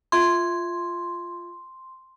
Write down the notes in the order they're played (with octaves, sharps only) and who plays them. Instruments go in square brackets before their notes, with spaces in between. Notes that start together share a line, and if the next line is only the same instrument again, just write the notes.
[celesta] F4 E5 G#6 [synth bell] C6